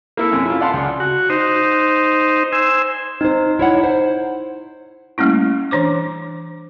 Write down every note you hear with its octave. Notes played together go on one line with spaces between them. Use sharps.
A#3 E4 A4
F#2 C3
E4 F4
D5 F5 F#5 A5 C6
C#2
F#4
D#4 C5
C5 G#5 E6
C4 D#4 C5
E4 C#5 F#5
C5
G3 A3 A#3 C#4 E4
E3 D4 C5 D6